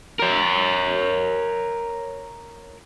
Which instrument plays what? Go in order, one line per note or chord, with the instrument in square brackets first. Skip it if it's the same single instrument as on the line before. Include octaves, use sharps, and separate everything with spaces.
[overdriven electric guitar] A#4 C#5